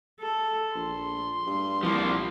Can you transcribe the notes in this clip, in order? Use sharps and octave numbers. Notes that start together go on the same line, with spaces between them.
A4
A#1 C6
G2
C2 F3 A#3